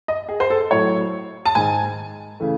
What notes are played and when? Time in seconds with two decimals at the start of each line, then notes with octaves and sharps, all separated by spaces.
0.08 D#5
0.29 G#4
0.40 C5
0.50 A4
0.71 A2 F#3 A3 C#5
1.46 A5
1.55 G#2 D#3 G#3 G#5
2.40 C#3 E3 A3